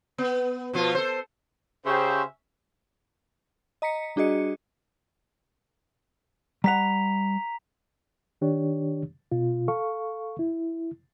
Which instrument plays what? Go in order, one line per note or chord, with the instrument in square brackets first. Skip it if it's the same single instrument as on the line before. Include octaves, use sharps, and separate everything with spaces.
[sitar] B3
B2 F3 F4
A4 C5
[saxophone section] C#3 [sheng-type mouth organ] C#4 E5 [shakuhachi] G4 [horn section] C5
[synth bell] D#5 A#5 B6 C#7
G3 D4 F#4 G#4 D#5 C#7
[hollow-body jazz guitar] G3 F#5 [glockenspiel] A#5 B6 F7
[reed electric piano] D#3 D4 G4 C#5
B2 F4
A4 F5 C#6
E4